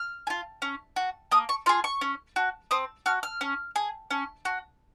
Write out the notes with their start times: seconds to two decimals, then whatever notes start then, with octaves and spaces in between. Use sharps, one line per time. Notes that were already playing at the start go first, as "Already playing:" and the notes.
Already playing: F6
0.27 G#4
0.30 F4
0.62 C#4
0.96 F#4
1.31 A#3 D#6
1.49 C#6
1.66 F4 G#4 C6
1.84 C#6
2.01 C#4
2.36 F#4
2.71 C4 D#6
3.06 F#4 F6
3.23 F6
3.41 C#4
3.76 G#4
4.11 C#4
4.45 F#4